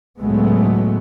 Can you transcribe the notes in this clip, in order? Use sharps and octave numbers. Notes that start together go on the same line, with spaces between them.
C#2 A2 F#3 G#3 A3 B3